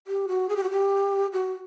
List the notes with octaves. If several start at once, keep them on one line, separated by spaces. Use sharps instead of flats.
G4
F#4
G#4
G4
F#4
G4
F#4